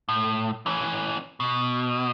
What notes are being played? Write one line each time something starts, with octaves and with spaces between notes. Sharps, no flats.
A2
E3 C#4
B2